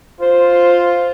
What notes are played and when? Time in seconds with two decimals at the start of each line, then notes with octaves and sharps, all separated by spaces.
0.21 F4 C5